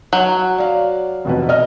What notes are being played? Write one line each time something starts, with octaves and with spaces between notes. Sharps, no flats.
F#3 F#5
D5 F5
F1 B2 B4
D#5 F6